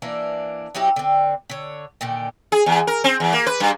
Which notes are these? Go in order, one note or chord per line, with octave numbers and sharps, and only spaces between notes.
E3 A#3 D4
F#3 D#4 E4 G4
D3 C4
D3 C#5
A#2 D3 D#3 G4
G#4
E2
A#4
C4
E2
A#3
B4
G2